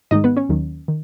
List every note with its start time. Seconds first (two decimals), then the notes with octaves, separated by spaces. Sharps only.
0.11 G#2 D#3 G#3 D#4 D#5
0.24 B3 B4
0.37 C#4 C#5
0.49 D#2 D#3 F#3
0.88 D#3